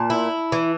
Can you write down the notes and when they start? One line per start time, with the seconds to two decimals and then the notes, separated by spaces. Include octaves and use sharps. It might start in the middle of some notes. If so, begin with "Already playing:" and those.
Already playing: A#2 A5
0.10 E4
0.52 E3